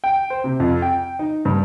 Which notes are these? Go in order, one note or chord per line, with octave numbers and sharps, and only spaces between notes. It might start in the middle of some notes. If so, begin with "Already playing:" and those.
G5
C5
C3
F2
G5
D#4
G2